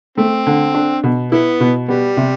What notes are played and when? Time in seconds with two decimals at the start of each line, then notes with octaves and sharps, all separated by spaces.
0.18 A3 C4
0.47 D3
0.74 D4
1.03 B2
1.32 B3 E4
1.60 B2
1.89 G3 B3
2.17 C3